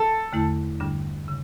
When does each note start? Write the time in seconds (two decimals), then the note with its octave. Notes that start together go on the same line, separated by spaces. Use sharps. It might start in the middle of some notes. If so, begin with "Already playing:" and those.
Already playing: A4
0.33 E2 D3 A3 E4
0.80 G2 D3 G3 D4
1.28 C#3